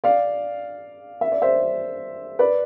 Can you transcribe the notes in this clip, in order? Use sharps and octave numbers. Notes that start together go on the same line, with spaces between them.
D5 F5
E5
D5
C5 E5
B4 D5